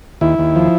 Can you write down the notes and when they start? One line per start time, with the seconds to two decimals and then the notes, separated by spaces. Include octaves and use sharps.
0.21 D#2 E4
0.38 D#2
0.56 F3